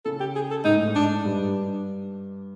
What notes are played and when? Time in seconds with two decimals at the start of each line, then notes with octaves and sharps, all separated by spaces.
0.05 C#3 A4
0.20 G4
0.35 G#4
0.51 A4
0.64 G#2 D#4
0.76 A2
0.87 G#2
0.96 D4
1.25 G2 D4